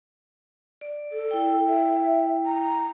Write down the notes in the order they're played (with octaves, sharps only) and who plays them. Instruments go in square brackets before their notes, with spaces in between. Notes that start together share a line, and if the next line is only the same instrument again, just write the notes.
[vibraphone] D5
[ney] A4
[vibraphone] E4 G5
[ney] E5
A#5